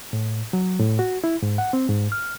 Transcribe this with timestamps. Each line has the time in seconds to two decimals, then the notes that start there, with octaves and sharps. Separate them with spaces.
0.13 A2
0.53 F#3
0.79 A2
0.99 F#4
1.24 E4
1.42 G#2
1.58 F#5
1.73 C4
1.89 G#2
2.12 F6